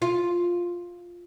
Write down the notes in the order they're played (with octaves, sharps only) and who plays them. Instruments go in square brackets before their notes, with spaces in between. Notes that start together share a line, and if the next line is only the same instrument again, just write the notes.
[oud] F4